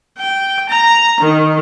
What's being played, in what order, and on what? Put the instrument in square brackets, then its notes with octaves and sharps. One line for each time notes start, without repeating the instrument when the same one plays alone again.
[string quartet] G5
A#5
D#3